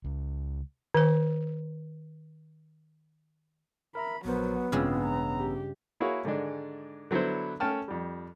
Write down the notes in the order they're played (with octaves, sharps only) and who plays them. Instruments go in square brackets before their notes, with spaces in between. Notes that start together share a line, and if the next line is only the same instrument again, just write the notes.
[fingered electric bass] C#2
[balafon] D#3 C5
[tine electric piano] A#4 E5 A#5 [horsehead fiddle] B5
[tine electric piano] A#1 A#4 C5 [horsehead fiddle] F#3 [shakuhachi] B3
[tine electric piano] A1 C#4 E6 [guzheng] G2 C#3 G#3 [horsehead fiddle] C4 F4
[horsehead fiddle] A#5
G4
[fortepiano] A#3 E4 F#4 G#4 C#5 F5
G#2 D3 D#3 G#3 D4
D3 F#3 B3 E4 C5
A3 C#4 G5 A5 F6
F2 G3